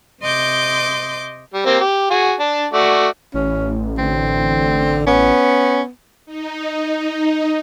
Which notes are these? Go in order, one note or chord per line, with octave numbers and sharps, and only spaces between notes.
C3 D#5 C6 D6 G6
G3
A#3 C4 G4
G4
F#4 G#4
D4 A5
A3 F#4 D5
A1 C#4
D3 C4
B3 C#4
D#4